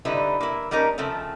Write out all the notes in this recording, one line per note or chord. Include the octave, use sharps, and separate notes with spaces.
D3 G3 D#4 E4 B4
A#3 E4
G3 A#3 C#4 D#4 A#4
C#3 F3 A3 C4